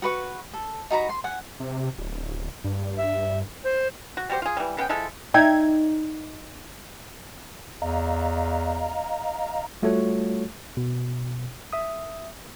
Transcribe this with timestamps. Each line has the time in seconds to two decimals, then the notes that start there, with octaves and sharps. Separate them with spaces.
0.02 F#4 B4 C#6
0.54 A4
0.90 D#4 F#4 A#5 B5
1.09 C6
1.24 F#5 G#5
1.60 C3
1.98 D1
2.64 G2
2.97 E5
3.63 C5
4.17 F#4
4.29 G3 F#4 G4 C5
4.42 F4 G#4
4.57 E3 G3
4.77 C#3 B3 C#4 G5
4.89 F3 G#3 E4 A4
5.34 D#4 E5 G5 G#6
7.82 E2 D#5 F5 A#5
9.82 G3 A3 F4 F#4 A4 C#5
10.77 B2
11.73 E5 D#6